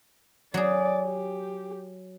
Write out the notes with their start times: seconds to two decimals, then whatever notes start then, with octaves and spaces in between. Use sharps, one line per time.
0.54 F#3 G#4 D5
1.03 G4